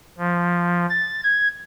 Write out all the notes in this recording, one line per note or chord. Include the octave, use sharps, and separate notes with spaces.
F3
A6
G#6